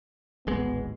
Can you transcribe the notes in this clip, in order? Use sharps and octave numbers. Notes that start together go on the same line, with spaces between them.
D1 G#1 G#3 B3